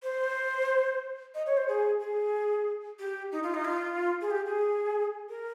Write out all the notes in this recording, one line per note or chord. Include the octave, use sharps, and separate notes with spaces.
C5
D#5
C#5
C5
G#4
G#4
G4
D#4
F4
D#4
F4
G#4
G4
G#4
A#4